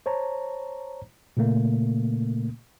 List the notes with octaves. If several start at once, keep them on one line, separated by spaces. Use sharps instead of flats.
C5 C#5 A5 A#5
A#2 C#3 A3 A#3